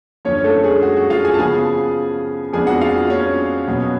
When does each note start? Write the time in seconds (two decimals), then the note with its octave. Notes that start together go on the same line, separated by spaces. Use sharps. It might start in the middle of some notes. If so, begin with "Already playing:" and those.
0.25 F#2 D3 F3 C#4 C#5
0.44 A3 A4
0.64 G#3 G#4
0.82 F#4
0.97 F#4
1.10 F4 F5
1.25 G#4 G#5
1.34 A5
1.39 C#3 F3 B3 G#4 G#5
2.53 F2 F3 G#3 B3 D4 G#4 G#5
2.67 F#4 F#5
2.81 F4 F5
3.10 C#4 C#5
3.67 B2 F#3 B3